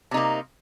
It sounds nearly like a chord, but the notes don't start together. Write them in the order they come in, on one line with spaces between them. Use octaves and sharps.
C3 D#4 A#3